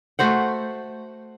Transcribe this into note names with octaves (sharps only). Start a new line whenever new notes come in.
A3 F#4 C5 F#5